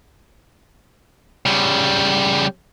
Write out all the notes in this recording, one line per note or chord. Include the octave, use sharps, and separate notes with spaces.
C#3 G3